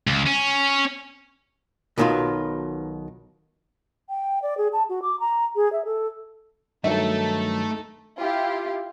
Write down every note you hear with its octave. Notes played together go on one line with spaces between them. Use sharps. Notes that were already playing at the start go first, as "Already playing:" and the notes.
C#2
C#4
B1 B2 D#3 B3 F4
G5
D5
G#4
A5
F#4
D6
A#5
G#4
E5
A4
G2 D#3 F#3 A3 D#4 A4 E5
E4 F4 G4